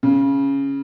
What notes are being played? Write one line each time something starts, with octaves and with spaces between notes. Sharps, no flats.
C#3